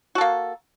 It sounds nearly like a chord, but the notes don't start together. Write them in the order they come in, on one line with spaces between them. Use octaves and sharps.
F#4 A4 A#3